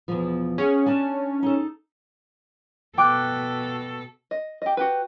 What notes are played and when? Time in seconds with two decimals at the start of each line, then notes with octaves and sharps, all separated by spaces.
0.08 E2 B2 F3
0.58 C#4 G#4 F#5
0.86 D4 G#5 A5
1.43 D#4 A4
2.98 B2 A4 G5 D6 F#6
4.31 D#5
4.62 G4 D#5
4.77 F#4 G4 B4